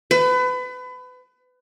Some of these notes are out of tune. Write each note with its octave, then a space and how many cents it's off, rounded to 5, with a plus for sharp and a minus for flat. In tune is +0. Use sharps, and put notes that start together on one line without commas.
B4 +30